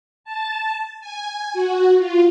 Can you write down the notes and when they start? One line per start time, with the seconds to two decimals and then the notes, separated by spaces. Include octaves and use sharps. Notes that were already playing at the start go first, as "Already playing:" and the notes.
0.24 A5
1.00 G#5
1.53 F#4
1.98 F4